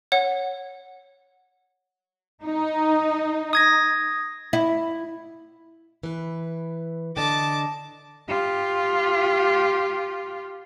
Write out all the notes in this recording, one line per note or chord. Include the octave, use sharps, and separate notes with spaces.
C#5 F#5
D#4
D#6 G#6 A#6
E4
E3 B4
D3 D#5 A5 D6
F4 G4